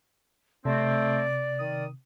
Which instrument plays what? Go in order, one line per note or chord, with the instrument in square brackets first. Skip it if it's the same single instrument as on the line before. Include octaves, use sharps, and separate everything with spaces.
[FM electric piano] C3 [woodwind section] A3 C4 [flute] D5
[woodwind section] D#3 D#6